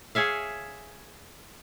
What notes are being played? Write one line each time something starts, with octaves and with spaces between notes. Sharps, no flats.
G#4 C#5 E5 F5